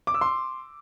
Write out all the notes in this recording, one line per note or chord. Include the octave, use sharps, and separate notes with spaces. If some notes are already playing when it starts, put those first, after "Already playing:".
D6
E6
C6